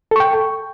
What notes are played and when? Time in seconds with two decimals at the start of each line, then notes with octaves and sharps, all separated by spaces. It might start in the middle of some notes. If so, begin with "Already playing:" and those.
0.11 A4
0.16 C#6
0.20 G5